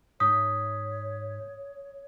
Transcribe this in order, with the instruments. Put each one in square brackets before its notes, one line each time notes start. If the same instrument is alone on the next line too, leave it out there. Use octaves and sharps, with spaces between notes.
[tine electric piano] G#2 G6 B6 [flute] C#5 [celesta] D#6